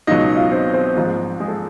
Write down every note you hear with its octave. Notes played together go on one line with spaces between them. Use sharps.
C#2 B2 F#3 D#4 D#5
F4 F5
C4 C5
C4 C5
A#1 G#2 F3
G#3 G#4
A4